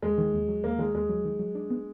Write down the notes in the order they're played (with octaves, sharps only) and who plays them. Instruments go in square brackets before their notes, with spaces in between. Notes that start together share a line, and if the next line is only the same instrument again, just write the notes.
[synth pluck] D#2 [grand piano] G#3
[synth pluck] D#3
D#2
F#3
[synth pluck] D#2 [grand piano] A#3
[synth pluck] D#3 [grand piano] G#3
[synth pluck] D#2 [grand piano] G#3
[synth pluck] F#3
D#3
F#3
D4
B3